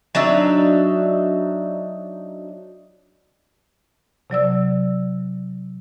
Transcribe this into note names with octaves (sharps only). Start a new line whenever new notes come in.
F#3 D4 D#4 E5
C3 F#3 D5 E6